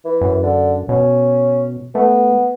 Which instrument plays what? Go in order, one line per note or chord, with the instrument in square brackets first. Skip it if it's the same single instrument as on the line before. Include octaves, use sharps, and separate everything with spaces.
[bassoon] E3
[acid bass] F#2
[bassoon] D3
[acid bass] B2 [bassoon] C#4
[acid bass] A3 [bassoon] B3